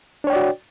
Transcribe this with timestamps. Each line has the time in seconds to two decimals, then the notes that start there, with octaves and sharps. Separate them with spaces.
0.24 D4
0.27 C#5
0.30 G5
0.33 D5
0.36 F#4